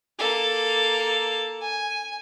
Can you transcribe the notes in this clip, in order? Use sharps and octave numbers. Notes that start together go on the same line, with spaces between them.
A#3 A4
G#5